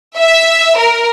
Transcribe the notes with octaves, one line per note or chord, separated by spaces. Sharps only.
E5
A#4